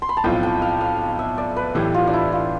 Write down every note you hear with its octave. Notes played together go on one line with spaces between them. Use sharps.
C6
B5
A5
B1 A2 F3 C4 F4 G5
G5
F5
F5
E5
D5
B4
B1 A2 E3 G4
F4
D4
E4
F4